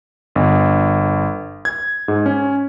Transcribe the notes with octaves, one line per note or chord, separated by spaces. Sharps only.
G1
G#6
G#2
C#4